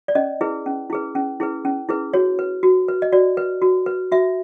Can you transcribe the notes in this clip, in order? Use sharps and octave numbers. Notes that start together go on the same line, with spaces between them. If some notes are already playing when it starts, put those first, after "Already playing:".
D5
C#4 D#5
E4 G#4 B4
C#4
E4 G#4 B4
C#4
E4 G#4 B4
C#4
E4 G#4 B4
F#4 C#5
B4
F#4
B4
D#5
F#4 D5
B4
F#4
B4
F#4 E5